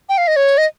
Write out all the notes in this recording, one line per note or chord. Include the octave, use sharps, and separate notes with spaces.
G5
F5
D#5
C#5
D#5